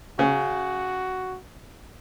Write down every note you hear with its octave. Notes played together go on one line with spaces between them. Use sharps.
C#3 F#4